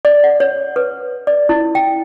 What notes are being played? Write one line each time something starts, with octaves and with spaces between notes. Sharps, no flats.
D5
F#5
C#5
B4
D5
E4
G5